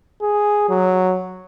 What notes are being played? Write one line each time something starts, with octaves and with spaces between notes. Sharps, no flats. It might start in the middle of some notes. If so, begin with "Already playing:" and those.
G#4
F#3